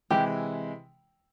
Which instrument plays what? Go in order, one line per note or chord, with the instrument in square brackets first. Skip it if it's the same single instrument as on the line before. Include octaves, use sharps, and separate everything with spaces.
[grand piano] C3 E3 G#3 E4 [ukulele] G4